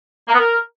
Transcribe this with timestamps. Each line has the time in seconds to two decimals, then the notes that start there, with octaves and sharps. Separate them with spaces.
0.28 A#3
0.34 B3
0.39 A#4